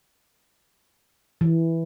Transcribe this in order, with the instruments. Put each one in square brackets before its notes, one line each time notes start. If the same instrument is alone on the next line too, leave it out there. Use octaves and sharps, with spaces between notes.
[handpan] E3